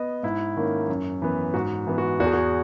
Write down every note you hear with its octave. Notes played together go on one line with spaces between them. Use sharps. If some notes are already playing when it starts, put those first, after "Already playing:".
Already playing: B3 D#5
G#2 E4
D#3 A#3 C#4
F#2
E3 B3
G#2 F#4
E3 B3
F#4
E2 F#4
G#4
F#4